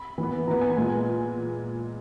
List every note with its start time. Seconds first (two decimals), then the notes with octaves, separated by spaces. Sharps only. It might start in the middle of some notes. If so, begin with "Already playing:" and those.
Already playing: B5
0.18 E3
0.23 B3
0.48 E3 B3 A#5
0.61 G#5
0.76 A#2 G#3 B3